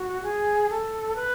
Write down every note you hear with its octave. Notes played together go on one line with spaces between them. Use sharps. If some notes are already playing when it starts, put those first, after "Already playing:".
Already playing: F#4
G#4
A4
B4